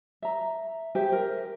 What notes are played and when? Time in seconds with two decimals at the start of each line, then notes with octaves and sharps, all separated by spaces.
0.22 E5 A#5
0.95 G4 G#4 C5 E5
1.12 A#4